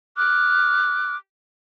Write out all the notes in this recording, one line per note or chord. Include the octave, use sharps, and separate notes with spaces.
D6 F6 F#6